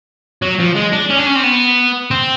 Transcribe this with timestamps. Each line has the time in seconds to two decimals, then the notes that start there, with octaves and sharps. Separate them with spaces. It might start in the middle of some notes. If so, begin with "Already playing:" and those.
0.42 F#3
0.59 F3
0.75 G#3
0.92 D4
1.10 C#4
1.19 D4
1.26 C#4
1.36 C4
1.44 B3
2.11 C4